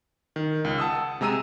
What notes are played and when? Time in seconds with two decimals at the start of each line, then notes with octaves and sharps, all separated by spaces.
0.36 D#3
0.64 C#2
0.78 F#5 A5 D#6 E6
1.21 C3 G#3 A#5 E6 D#7